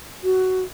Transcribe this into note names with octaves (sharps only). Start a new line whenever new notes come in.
F#4